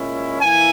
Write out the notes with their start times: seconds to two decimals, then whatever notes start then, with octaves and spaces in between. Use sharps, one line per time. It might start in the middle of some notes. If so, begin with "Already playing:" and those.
Already playing: A#2 G#3 C#4 E4
0.41 E3 A#3 E4 G#5